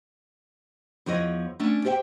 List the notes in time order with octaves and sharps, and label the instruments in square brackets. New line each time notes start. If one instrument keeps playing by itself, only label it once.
[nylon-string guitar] E2 F3 E4 C#5 D#5
A3 C#4 D4
G4 C5 E5 F#5 G5